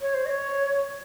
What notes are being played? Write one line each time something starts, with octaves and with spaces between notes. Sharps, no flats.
C#5
C5
D#5
C#5